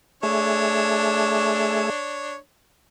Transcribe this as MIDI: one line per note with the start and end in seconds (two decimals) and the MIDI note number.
0.23 1.90 57
0.23 2.36 62
0.23 1.90 68
0.23 2.36 73
0.23 1.90 76